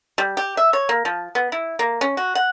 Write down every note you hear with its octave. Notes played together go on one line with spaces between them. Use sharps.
G3
G4
E5
C#5
A#3
F3
B3
E4
A#3
C#4
F#4
F#5